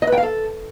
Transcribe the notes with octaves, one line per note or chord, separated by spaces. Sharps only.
D#5
B4
G5
F5
A4